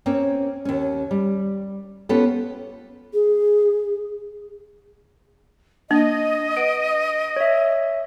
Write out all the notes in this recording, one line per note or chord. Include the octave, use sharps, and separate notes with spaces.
A#3 C4 C#4
D#2 C#4
G3
B3 C#4 F4 G4 A4
G#4
A#3 D4 D#5
B4 F#5 D7
C#5 E5